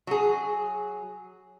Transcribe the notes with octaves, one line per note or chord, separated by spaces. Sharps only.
F#3 G#4